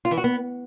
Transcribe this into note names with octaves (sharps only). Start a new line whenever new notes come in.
F4
E3
F#4
B3